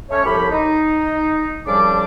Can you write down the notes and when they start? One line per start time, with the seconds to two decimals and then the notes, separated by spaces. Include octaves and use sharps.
0.10 A3 C#4 C#5
0.25 C2 A2 F3 G4 B5
0.51 D#4
1.67 C2 C#3 F3 G3 D4 D6